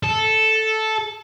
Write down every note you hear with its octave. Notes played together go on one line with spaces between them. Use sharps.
A4